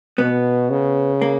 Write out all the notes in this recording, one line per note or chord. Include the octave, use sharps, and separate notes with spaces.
B2 B3
C#3
A#3